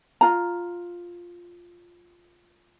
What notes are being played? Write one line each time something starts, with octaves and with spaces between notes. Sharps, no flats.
F4 A#5